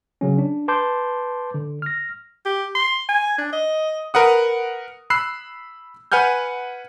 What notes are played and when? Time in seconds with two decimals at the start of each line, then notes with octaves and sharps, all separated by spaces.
0.21 C#3 F#3 C#4
0.38 D4
0.68 B4 A5 C6 D6 G6
1.54 D3
1.82 F6 A#6
2.46 G4
2.75 C6
3.09 G#5
3.38 D4
3.53 D#5
4.14 A#4 B4 F#5 D#6
5.10 B5 E6 F#6 C7
6.12 B4 F#5 G#5 F6 G6